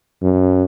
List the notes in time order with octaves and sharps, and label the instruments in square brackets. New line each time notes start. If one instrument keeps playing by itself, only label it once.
[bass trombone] F#2